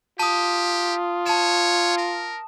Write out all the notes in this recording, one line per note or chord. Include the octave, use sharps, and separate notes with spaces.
F4 G4 A5 D#6
C#5 A5 E7
A#4